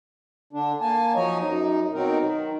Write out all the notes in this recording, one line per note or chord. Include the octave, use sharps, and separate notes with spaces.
D3 D4
A#3 G#5 A5
F3 F#3 D#4 C#5 D#5 G#5
F#2 D#4
B2 F#3 C4 D#4 A#4
D#3